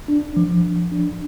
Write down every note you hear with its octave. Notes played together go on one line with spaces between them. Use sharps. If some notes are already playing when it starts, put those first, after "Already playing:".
D4
F3
F3
D4